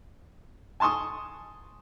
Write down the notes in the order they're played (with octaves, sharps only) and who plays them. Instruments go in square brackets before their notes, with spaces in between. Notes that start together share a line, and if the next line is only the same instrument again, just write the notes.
[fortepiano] G#5 A5 C6 C#6 D#6